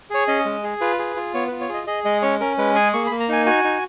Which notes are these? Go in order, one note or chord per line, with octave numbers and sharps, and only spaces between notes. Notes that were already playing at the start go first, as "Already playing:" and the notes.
G#4 C#5
C#4 D#5
G#3
G#4
F4 B4
G#4
F4
B3 C#5
F4 B4
C#5
G#4 D#5
G#4 D#5
G#3 D#5
C#4 C#5
C#4 A#4
G#3 B4
G#4 G#5
A#3 C#6
A#3 B5
A#5
D#4 G#5
F#4 G#5
D#4